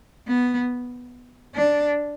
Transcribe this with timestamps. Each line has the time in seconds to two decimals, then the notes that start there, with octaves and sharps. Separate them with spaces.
0.28 B3
1.55 D4